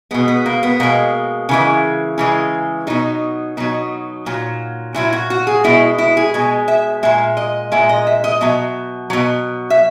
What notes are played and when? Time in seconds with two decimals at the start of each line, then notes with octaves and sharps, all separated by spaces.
0.11 B2 G#3 B3
0.28 B3
0.46 A#3
0.63 B3
0.80 B2 G#3 A#3
1.49 C#3 E3 G#3
2.18 C#3 E3 G#3
2.87 B2 F#3 D#4
3.57 B2 F#3 D#4
4.26 A#2 F#3
4.94 A#2 F#3 E4
5.13 F#4
5.30 F#4
5.47 G#4
5.64 B2 G#3 E4
5.98 E4
6.17 G#4
6.34 B2 G#3
6.68 E5
7.03 A#2 G#3 E5
7.37 D#5
7.72 A#2 G#3 E5
7.89 D#5
8.07 E5
8.24 D#5
8.41 B2 F#3 E5
9.10 B2 F#3
9.70 E5